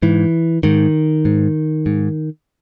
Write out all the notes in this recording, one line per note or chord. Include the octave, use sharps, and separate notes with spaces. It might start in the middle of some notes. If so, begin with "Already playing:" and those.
G#2 E3
G#2 D#3
G#2
G#2